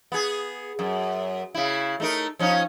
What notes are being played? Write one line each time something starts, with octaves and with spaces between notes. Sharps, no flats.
B3 G#4
F#2
C#3 E4
A3 D#4 A#4
F3 C#4 D#4